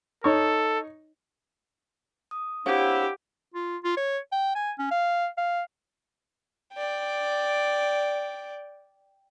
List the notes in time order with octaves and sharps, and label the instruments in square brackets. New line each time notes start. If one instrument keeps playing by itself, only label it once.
[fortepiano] D#4 C#5 [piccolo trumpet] A4
[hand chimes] D#6
[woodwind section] C4 D4 E4 [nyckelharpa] G4 [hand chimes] C#5 F5 F#5
[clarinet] F4
F4
C#5
G5
G#5
C#4
F5
F5
[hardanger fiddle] D5 G5